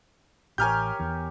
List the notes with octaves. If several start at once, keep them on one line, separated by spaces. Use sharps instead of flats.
A1 G4 A#4 C#5 G#5 F6 G6
E2